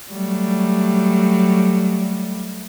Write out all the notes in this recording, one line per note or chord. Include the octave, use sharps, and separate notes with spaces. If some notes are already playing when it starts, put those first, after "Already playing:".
F#3 G3 A3